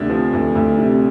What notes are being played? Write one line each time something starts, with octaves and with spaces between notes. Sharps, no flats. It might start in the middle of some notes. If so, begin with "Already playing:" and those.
Already playing: D2 C3 D4
F3
D2
D2
C3